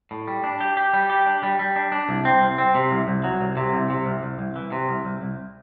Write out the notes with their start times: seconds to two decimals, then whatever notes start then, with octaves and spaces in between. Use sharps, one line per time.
0.11 A2
0.28 G3
0.44 D4
0.61 G4
0.77 G4
0.94 G3
1.10 G4
1.26 D4
1.43 G3
1.59 G3
1.76 D4
1.92 D4
2.09 C2
2.25 C4
2.42 C2
2.58 C4
2.75 C3
2.91 C2
3.08 C2
3.24 F#3
3.41 C2
3.57 C3
3.73 C2
3.90 C3
4.06 C2
4.23 C2
4.39 C2
4.56 E3
4.72 C3
4.89 C2
5.05 C2
5.22 C2